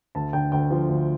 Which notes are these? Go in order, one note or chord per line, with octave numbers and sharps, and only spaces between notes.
D2 A5
D3 G5
D2 G5
F3
D2